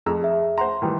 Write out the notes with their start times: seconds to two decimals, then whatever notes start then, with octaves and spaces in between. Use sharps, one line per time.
0.06 F2 G#4 A#5 E6
0.22 G#4 E5
0.58 C5 F#5 A#5 C6
0.82 D#3 E3 G3